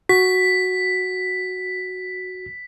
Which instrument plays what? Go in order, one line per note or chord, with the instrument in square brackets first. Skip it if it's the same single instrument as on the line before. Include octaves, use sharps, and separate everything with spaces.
[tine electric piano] F#4 [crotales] B6